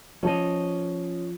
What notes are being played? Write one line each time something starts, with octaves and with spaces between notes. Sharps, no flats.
F3 C#4 D#5